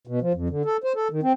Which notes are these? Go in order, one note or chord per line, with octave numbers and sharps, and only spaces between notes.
B2
F3
F2
D3
A4
C5
A4
D#3
C4